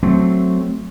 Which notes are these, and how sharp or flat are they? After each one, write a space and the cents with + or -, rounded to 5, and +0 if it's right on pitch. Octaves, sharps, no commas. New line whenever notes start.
F#3 +0 A3 +0 C4 +0